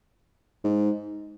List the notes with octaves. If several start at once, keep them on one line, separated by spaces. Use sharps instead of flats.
G#2